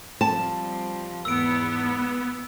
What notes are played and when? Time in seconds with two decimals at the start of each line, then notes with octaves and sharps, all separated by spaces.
0.21 F3 G3 C4 A5
1.25 E2 G#2 B3 E6 D7